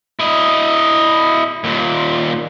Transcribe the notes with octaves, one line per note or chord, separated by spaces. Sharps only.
E4 D#5
D#2 A#2